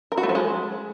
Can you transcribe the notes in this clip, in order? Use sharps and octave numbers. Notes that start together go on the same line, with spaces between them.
A#4
F#4
A3
F3
G#3